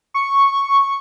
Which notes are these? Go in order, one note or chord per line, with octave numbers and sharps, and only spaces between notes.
C#6